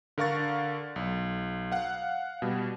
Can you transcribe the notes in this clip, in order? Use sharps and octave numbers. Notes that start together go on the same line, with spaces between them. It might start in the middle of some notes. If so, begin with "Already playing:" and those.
D3 A#4 F5 C#6 A6
B1
F5 F#5
B2 G3